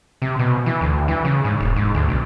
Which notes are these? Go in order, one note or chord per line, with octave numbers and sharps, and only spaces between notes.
C3
B2
E3
D2
E3
C#3
G#2
E1
G#2
D2
B1